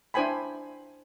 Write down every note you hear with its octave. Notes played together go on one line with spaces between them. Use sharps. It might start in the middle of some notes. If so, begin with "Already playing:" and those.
D4 E4 C5 G5 G#5 B5